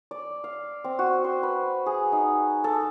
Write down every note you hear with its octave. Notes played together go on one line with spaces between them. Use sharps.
D5
F5
C4
F#4
C5
B4
G#4
D#4
A4